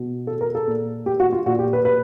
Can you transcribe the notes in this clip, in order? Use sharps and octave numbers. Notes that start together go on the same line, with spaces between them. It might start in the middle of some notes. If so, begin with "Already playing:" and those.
Already playing: B2
A4
A#4
A4
A#2
G4
F#4
F4
A#2 F#4
G4
B4
B4